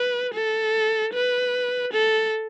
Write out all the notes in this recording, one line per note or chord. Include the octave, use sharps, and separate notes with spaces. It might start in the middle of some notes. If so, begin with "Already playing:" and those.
Already playing: B4
A4
B4
A4